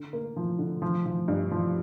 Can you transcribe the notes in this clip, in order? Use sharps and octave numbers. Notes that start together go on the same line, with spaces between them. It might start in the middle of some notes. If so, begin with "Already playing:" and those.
Already playing: D3
A#3
F3
D3
F3
F3
G2
F3